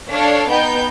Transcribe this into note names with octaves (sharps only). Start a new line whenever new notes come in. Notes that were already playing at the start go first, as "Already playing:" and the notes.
D4 A4 C#5 F5
B3 D#4 G5 G6